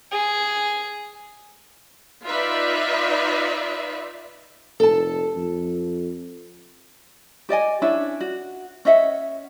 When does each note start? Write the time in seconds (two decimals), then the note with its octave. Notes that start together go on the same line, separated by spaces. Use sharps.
0.12 G#4
2.25 D#4 F4 B4 D5 E5
4.80 F1 A4 A5
5.35 F2
7.49 G4 D5 D#5 G#5
7.82 C#4 D4 E4 E5
8.20 F#4
8.85 C#4 D#5 E5 F#5